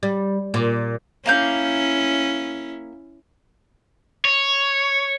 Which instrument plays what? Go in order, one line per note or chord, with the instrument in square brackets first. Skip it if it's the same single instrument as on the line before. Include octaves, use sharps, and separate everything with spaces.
[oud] G3
A#2
[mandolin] A#3 F5 G6 [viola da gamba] C#4 E4
[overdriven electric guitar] C#5